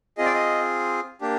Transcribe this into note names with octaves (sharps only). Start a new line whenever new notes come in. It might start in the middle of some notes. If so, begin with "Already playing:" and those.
C4 F4 G#4 D#5
D5
D#5
A#3 D4 G4